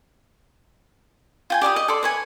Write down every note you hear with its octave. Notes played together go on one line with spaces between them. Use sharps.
F4 G5 G#5
G4 D5 B5 D#6
D#5
A4 D5 C6
B4 C#5 G#5